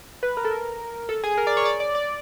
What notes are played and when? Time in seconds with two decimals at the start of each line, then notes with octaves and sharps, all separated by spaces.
0.23 B4
0.37 A#4
0.45 A4
0.51 A#4
1.09 A4
1.24 G#4
1.38 A#4
1.47 D5
1.57 C#5
1.65 D5
1.80 D5
1.95 D5